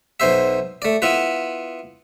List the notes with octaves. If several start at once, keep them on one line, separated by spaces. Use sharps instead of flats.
B1 B2 C5 E5
A3 D5
B3 E4 F4 B4